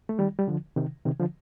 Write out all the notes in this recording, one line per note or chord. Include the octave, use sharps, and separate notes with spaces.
A3
D#3 G3
G3
D3 F3
C3 D#3
C3 D#3
D3 F3